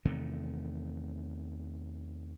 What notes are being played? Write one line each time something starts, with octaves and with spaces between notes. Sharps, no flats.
E2 C3 D#3 A3